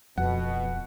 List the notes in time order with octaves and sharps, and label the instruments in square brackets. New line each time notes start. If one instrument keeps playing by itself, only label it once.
[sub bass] D1 [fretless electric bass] F2 [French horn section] B2 [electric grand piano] F#5